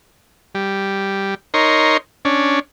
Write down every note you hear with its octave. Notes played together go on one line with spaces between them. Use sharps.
G3
D#4 A#4 C#5 C6
C#4 D4